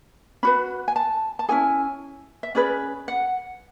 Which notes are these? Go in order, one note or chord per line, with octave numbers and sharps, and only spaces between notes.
C#4 F#4 B4 B5
G#5
A5
A5
C#4 E4 G#4 G#5
E5
C#4 G#4 B4 D5
F#5